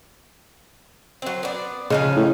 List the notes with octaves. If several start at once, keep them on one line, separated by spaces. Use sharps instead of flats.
F#3 C4
B3 D5
C#3 F3 G#3 D#4
A2